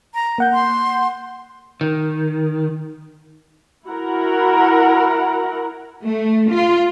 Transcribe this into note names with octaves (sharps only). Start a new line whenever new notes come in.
A#5
A#3 F#5 G6
C6
D#3
E4 F#4 A#4 F#5 A#5
A3
F4